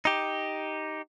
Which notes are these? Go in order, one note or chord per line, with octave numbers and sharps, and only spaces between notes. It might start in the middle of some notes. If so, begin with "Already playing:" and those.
D#4 G4